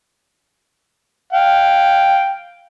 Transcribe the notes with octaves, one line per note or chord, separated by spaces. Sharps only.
F5 G5